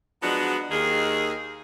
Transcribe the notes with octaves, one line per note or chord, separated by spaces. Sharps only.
F3 F#3 G#3 B3 D4 F#4
D#2 D#3 G#4